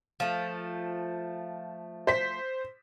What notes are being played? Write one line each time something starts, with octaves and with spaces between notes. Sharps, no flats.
F3 A3
C5 B6